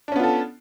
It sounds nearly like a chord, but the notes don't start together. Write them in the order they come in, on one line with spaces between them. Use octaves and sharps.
D4 C#4 B3 F4 A4